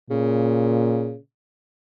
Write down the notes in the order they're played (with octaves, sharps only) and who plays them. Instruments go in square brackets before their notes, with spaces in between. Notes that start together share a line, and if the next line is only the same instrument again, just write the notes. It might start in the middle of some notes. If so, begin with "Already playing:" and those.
[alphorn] A#2 [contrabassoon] C#3